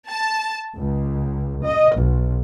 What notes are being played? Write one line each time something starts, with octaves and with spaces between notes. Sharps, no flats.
A5
C#2
D#5
B1